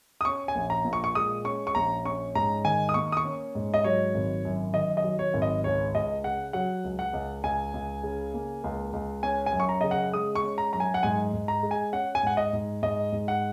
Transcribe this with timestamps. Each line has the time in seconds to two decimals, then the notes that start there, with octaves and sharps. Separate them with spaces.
0.21 D#6
0.25 C#4 C#6
0.48 G#5
0.55 A#1
0.70 A#5
0.85 A#2
0.93 C#6
1.04 C#6
1.15 G#3 D#6
1.45 C#4 C#6
1.67 C#6
1.75 A#1 A#5
2.04 C#4 C#6
2.35 G#2 A#5
2.65 D#3 G#5
2.89 D#6
2.94 A#3 C#6
3.12 D#6
3.17 C#6
3.24 C#4
3.55 G#2
3.74 D#5
3.84 F#3 C#5
4.15 G#1
4.45 F#2
4.74 D#3 D#5
4.97 D#5
5.04 F#3
5.19 C#5
5.34 G#1
5.42 D#5
5.64 C#2 C#5
5.94 C#2 D#5
6.24 C#3 F#5
6.53 F#3 F#5
6.84 C#2
6.99 F#5
7.13 C#2
7.43 C#2 G#5
7.74 C#2
8.03 C#3
8.34 A#3
8.64 C#2
8.93 C#2
9.23 C#4 G#5
9.46 G#5
9.53 F#2
9.60 C#6
9.69 A#5
9.81 C#3 D#5
9.91 F#5
10.13 G#3 D#6
10.35 C#6
10.43 C#4
10.58 A#5
10.73 F#2 A#5
10.80 G#5
10.94 F#5
11.03 G#2 G#5
11.33 G#2
11.48 A#5
11.63 G#3
11.71 G#5
11.92 C#4 F#5
12.15 G#5
12.23 G#2 F#5
12.37 D#5
12.53 G#2
12.82 G#2 D#5
13.12 G#2
13.28 F#5